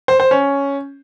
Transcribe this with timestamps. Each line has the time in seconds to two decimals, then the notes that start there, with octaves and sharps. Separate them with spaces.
0.08 C5
0.20 C5
0.31 C#4